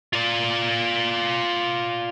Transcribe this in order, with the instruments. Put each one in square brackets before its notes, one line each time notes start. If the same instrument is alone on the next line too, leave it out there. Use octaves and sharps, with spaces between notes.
[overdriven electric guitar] F4 D5